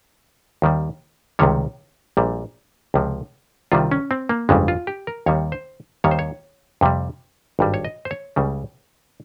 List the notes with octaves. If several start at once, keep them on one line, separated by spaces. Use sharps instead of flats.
D#2 D#3 G3
C#2 C3 D#3 G3 C#5
A#1 A#2 G3
C#2 C3 F3
C2 C3 D#3 G3 F4
C#4
C4
A#3
G1 F2 C#3 G3 G#3
F4
G4
A#4
D#2 D#3 G3 C#5
C5
D#2 D#3 G3 C#5
C5
C#5
F2 C3 G3
G#1 G2 G3
C#5
D#5
C5
C#5
C#2 C#3 G3